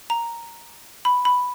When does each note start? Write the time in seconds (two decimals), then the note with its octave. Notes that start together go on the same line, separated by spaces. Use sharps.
0.10 A#5
1.05 B5
1.25 B5